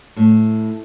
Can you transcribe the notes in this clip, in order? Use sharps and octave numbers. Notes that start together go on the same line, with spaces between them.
A2